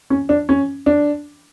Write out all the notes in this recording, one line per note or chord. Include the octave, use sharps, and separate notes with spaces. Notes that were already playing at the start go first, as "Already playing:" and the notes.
C#4
D4
C#4
D4